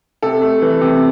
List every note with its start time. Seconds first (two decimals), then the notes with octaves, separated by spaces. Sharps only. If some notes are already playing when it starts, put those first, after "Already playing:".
0.22 C3 A4
0.42 A3
0.62 E3
0.81 C3